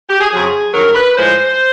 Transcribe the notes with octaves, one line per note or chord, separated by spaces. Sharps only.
G4
G#4
F2 C#3 F#3 G#4
G2 D#3 F#3 A#4
B4
A2 F3 G#3 C5